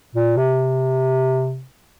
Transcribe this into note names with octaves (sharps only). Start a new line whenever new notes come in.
A#2
C3